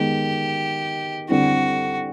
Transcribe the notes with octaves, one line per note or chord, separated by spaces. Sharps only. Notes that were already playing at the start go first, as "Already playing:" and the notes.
Already playing: D#3 G#3 B3 G4
D3 G3 C4 E4 F#4